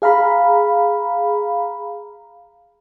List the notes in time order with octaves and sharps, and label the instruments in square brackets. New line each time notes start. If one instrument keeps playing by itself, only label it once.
[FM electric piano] G#4 F5 A#5 B5